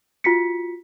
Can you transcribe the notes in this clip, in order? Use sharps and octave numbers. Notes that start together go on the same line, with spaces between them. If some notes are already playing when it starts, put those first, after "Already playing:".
F4 F#4 B6 C#7